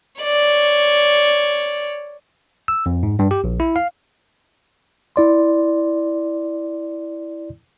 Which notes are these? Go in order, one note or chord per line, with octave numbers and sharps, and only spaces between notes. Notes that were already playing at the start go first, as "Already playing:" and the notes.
C#5 D5
E6
F2
G#2
G2
G4
A#1
E4
F5
E4 D5 C6